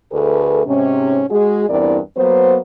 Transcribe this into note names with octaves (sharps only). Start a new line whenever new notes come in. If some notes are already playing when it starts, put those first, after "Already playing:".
D2 A3 G#4 A4 B4
G#2 C3 C#4
G#3 F#4 G#4
E2 G2 C4 E4 A#4 D5
F#3 A#3 B3 C5